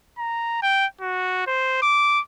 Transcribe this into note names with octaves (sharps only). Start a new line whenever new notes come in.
A#5
G5
F#4
C5
D6